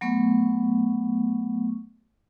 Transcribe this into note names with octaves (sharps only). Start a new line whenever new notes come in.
F#3 A3 B3 C#6